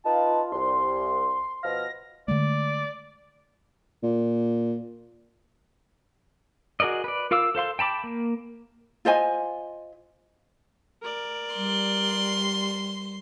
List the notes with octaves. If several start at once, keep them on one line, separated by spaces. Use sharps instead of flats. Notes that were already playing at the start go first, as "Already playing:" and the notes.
D#4 F4 B4 A5
C2 C6
B2 F3 F6 A#6
D3 G#3 A3 D5
A#2
F#4 G#4 A#4 D5 D#5
B4 D5
F4 A#4 F5 D6 E6
A4 C5 F5 C6
G5 A5 B5 D6
A#3
F4 C5 D#5 G#5
A#4 D5
G3 C6